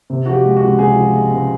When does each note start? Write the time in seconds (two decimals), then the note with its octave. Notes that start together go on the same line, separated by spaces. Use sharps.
0.10 C3
0.25 F3 F#4
0.33 G4
0.45 G#3
0.56 F#4
0.62 C#2
0.79 C3 G#4
0.96 F3
1.13 G#3
1.31 C#2